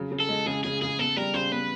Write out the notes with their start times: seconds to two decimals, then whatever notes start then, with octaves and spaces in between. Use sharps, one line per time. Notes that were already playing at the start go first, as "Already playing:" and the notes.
Already playing: C#3 F#3
0.12 C#3
0.20 A4
0.29 G#3
0.46 C#3 G#4
0.64 C#3 G#4
0.82 C#3 G#4
0.99 B3 A4
1.17 G3 A#4
1.34 C#3 C5
1.52 B3 B4